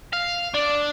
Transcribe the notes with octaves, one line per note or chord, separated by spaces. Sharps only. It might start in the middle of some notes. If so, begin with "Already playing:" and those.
F5
D4